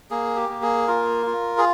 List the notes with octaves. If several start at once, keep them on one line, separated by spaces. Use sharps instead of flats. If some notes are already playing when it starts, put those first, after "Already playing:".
A#3 G#4
G4
A#3
G#4
F4 A#4
F4
G#4